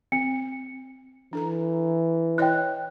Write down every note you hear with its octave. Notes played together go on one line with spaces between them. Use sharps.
C4 C#7
E3 D4 A4 A#5
E4 C#5 D#5 G5 F#6